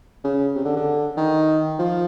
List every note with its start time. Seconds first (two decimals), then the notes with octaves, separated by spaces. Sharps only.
0.24 C#3
0.55 C3
0.65 D3
0.76 D3
1.17 D#3
1.79 F3